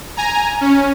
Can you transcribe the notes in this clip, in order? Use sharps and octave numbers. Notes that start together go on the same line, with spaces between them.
G#5 A#5
C#4